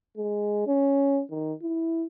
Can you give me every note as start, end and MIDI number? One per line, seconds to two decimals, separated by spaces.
0.17 0.67 56
0.67 1.21 61
1.30 1.53 51
1.62 2.06 64